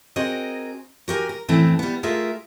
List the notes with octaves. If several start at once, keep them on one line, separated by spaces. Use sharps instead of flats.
C4 F#4 G#4 A#4 D#5
F#4 G4 A#4 G#5
A#4
F#2 A2 E3 A3 C4
G3 B3
A3 F4 G#4 A#4 E5